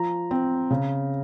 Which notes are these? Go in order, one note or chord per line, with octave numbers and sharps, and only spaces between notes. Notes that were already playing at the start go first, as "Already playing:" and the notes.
Already playing: F3 A#5
C4
C#3